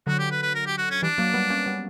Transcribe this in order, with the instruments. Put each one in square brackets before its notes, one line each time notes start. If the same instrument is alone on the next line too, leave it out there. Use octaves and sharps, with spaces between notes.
[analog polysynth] D3 F#3 [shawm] F#4
[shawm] G4
B4
B4
A#4
G4
F#4
C#4
[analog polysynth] E3 G3 [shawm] D4
[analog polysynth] F#3 A#3
G3 B3
A#3 C#4
G3 B3